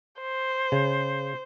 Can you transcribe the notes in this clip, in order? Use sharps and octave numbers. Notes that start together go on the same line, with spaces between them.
C5
C#3